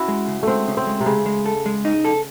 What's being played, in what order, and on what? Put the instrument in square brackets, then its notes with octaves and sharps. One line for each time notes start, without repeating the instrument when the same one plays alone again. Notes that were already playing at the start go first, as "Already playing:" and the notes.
Already playing: [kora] C#4 E4 F#4
[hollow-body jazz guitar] G#3
C#3
[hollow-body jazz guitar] G#3 [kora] A3 C4
[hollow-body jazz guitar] C#3
[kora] C4
[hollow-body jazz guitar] G#3
[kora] C3
[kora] C#3 [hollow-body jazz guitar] G#3
[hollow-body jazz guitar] G#3
A4
G#3
D#4
A4